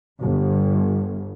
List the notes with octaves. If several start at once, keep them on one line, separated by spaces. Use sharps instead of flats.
G1